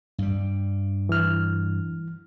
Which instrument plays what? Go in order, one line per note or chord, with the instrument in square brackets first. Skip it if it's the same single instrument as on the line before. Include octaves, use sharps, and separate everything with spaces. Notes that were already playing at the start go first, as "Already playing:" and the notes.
[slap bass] G2 G3
[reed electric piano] E3 F6